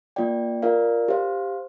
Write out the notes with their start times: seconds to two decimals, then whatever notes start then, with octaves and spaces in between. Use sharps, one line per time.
0.16 A#3 F4 D5 G5
0.62 F4 A#4 D5 F5
1.08 G4 C5 F5